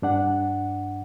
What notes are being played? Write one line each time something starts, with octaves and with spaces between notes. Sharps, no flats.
G2 D4 F#5